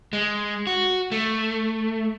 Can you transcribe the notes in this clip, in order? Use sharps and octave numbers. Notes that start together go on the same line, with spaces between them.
G#3
F#4
A3